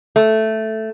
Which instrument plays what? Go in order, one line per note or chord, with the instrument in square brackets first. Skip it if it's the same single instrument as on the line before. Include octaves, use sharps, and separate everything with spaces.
[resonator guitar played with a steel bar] A3